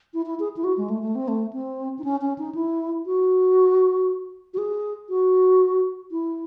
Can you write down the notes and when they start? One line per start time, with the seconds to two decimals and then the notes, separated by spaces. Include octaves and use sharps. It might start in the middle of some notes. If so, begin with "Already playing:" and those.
0.14 E4
0.26 E4
0.40 G#4
0.56 E4
0.64 F#4
0.77 G#3
0.90 A3
1.02 A3
1.15 C4
1.28 A3
1.53 C4
1.99 D#4
2.04 C#4
2.21 C#4
2.38 D#4
2.55 E4
3.06 F#4
4.54 F#4
4.58 G#4
5.09 F#4
6.11 E4